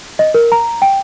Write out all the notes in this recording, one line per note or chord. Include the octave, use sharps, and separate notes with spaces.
D#5
A#4
A#5
G5